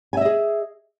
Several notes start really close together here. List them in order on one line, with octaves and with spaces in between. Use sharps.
G#5 E5 D#5 G#4